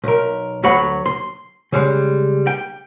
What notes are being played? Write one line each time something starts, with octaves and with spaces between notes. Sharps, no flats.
B1 A#4
D2 F#3 F#5 B5
C6
C#3 G3 G#3
G5